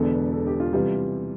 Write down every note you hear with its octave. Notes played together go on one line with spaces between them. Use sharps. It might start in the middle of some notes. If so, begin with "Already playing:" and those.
Already playing: E1 E2 D3 A4
B4
A4
G4
F4
C3 E3 G3 F4